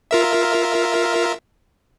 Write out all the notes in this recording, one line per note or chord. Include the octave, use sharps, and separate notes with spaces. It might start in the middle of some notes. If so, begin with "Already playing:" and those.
F4 A#4 E5